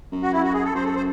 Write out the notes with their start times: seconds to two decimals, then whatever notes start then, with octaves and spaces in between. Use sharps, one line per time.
0.12 F#2
0.22 F#4
0.33 E4
0.43 F#4
0.54 G#4
0.64 A4
0.75 F#2 C5
0.85 A4
0.96 C5